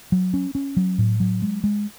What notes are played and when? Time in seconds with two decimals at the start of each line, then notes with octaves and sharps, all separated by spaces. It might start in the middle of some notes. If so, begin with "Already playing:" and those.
0.12 F#3
0.34 C#4
0.55 C#4
0.77 F#3
0.98 A2
1.20 F#3
1.42 G#3
1.64 G#3